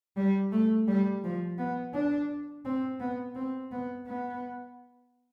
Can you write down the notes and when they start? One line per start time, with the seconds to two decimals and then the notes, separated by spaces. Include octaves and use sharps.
0.17 G3
0.52 A3
0.88 G3
1.24 F3
1.58 B3
1.94 D4
2.65 C4
3.00 B3
3.35 C4
3.72 B3
4.06 B3